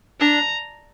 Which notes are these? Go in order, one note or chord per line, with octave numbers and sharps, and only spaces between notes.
D4 A#5